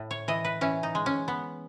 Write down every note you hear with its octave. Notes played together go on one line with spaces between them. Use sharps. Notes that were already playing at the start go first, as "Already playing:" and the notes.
Already playing: A2
C#5
E3 D#5
B4
E3 C#4
D#4
G#3
C#4
B3